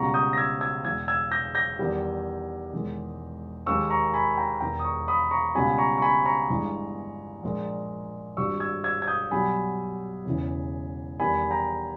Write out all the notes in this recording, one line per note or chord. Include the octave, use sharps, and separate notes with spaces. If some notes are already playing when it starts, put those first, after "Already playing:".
Already playing: C#2 B2 G3 A#5 C#6
D#6 G6
A#6
E6 G#6
E6 G#6
E2 B2 G#3 E6 G#6
E6 G#6
G6 A#6
G6 A#6
E2 D#3 G3
E1 E2 D#3 G#3
D#2 D#3 G#3 C#6 E6
A#5 C#6
G#5 B5
G5 A#5
E1 E2 D#3 G5 A#5
D#6
A#5 C#6
B5 D#6
A#5 C#6
C#2 B2 G3 G#5 B5
A#5 C#6
C#6
G#5 B5
A#5 C#6
G1 G2 E3 G#3
A#1 A#2 G#3
G#1 G2 G3 C#6 E6
E6 G#6
E6 G#6
G#6
D#6 G6
B1 B2 G3 G#5 B5
E1 E2 C#3 E3
E1 E2 D#3 G3 G#5 B5
G5 A#5